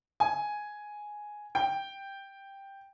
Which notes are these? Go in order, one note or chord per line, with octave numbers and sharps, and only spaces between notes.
G#5
G5